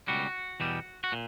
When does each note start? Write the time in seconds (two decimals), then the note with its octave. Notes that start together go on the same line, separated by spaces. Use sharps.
0.08 C#2 B2 G3 F#4
0.60 E2 B2 G3
1.04 F#4
1.12 A#2